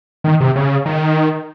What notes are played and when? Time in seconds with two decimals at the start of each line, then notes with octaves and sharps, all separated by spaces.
0.24 D#3
0.40 C3
0.56 C#3
0.86 D#3